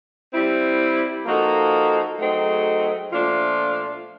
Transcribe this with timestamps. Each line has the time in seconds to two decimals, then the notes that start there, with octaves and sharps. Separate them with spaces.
0.33 G3 C4 E4
1.25 F3 A#3 D#4 F#4 A4
2.19 F#3 A3 C4 D#4 G#4
3.11 A#2 F3 A3 D4 F4